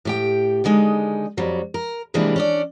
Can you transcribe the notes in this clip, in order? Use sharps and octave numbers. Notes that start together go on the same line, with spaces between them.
A2 G4 G5
D3 D#3 G#3 D#4
F2 F#3 G3
A#4
C3 E3 G3 G#3 A#3 D4
C#4 D4 D5